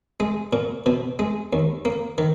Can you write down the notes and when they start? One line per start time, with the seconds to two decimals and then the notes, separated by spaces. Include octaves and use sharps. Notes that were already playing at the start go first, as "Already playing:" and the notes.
0.20 G#3
0.53 A#2
0.86 B2
1.19 G#3
1.53 D#2
1.85 A#3
2.18 D#3